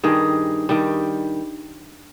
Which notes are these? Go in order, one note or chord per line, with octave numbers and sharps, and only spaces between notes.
G2 D#3 G3 G#4
G2 D#3 G3